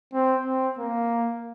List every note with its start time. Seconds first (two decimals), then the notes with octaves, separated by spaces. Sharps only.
0.13 C4
0.46 C4
0.78 A#3